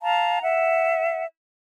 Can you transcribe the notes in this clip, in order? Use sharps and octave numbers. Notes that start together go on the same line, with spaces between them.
F5 A5 A#5
E5 F#5